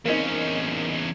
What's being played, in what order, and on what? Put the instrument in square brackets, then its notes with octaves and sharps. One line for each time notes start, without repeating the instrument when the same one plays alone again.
[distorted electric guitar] E2 C#4 [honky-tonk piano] A#3 C4 D#4